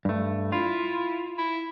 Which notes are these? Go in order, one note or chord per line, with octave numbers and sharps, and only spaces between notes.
G2 A3
E4 F4
E4